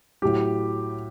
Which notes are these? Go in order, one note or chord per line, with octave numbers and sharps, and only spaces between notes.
A2 F#3 G4